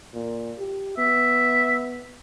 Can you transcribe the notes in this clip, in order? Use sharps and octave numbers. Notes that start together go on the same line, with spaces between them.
A#2
G4
B3 E5